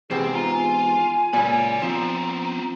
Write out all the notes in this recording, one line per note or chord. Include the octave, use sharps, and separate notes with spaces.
E2 G#2 C3 C4 G#4
F4 A#5
G#5
C#2 A#2 D5 B5
F3 B3 C4 A#5